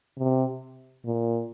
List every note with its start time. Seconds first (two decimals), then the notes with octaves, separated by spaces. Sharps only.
0.18 C3
1.05 A#2